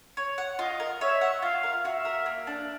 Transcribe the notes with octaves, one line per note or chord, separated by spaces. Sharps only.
C#5
F#5
F4 D#5
A#4
C#5 E5
F#5
F4 F5
A#4
F#4 E5
A#4
A#3
D4